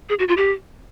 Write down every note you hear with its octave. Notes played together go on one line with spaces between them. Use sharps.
G#4
F#4
F4
G4